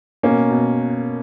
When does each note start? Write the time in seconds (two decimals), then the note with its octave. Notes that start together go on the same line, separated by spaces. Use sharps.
0.23 B2 A#3 C#4
0.50 B2